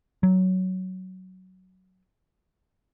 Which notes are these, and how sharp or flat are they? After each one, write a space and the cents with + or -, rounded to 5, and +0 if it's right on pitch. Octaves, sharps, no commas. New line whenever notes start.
F#3 +10